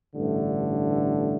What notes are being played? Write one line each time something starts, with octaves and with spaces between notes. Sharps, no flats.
A1 G2 D3 A3